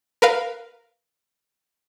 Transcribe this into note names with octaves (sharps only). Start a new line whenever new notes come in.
A#4 B4 F5